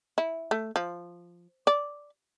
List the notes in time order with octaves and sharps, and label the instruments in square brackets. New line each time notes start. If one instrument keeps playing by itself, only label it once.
[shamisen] E4
A3
F3
D5